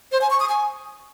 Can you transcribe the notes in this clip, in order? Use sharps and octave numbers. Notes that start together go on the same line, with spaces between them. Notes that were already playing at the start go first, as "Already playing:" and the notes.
C5
G#5
C#6
D#6
G#5